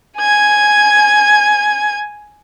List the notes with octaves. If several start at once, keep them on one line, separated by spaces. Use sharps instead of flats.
G#5 G#6